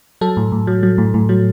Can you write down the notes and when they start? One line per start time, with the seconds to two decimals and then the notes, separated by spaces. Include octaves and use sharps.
0.21 F#3 A4
0.37 A2
0.52 A2
0.67 F#3
0.83 F#3
0.98 A2
1.14 A2
1.29 F#3